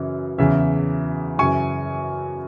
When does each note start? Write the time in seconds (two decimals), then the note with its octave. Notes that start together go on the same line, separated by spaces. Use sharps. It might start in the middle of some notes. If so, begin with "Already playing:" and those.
Already playing: F#2 C#3 E3
0.38 E2 C#3 E3 E5
1.38 F#2 C#3 E3 G#5 C#6